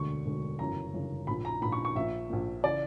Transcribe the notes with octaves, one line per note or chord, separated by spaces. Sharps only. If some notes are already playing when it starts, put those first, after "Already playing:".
Already playing: E1 D2 D3 C#6
E1 D2 D3
G1 F#2 C#3 E3 A#5
G1 F#2 C#3 E3
A#1 A#2 B5
A#5
A#1 A#2 B5
C#6
C#6
A#1 A#2 E5
A#1 A#2
C#3 E3 D5